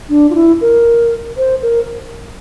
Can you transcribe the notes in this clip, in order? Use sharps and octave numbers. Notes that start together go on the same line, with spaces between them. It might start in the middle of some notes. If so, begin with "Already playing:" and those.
D4
F4
E4
A#4
C5
A#4